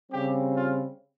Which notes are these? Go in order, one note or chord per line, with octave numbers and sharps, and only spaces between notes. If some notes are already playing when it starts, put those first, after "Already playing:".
C#3 G3 C4 G4
F4